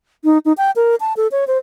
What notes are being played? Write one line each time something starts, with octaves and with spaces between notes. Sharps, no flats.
D#4
D#4
G5
A#4
A5
A4
C#5
C5